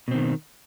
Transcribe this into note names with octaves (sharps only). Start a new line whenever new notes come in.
B2 D#3 C4